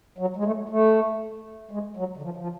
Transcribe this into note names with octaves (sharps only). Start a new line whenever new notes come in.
F#3
G#3
A3
A3
G#3
F#3
D3
F3
F3